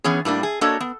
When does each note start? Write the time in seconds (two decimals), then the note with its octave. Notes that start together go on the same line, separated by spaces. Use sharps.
0.04 E3 B3 C#4 G#4
0.25 A2 G3 A#3 D4
0.43 G#4
0.61 A#3 D4 F#4 A4 C#5 D#5
0.80 B3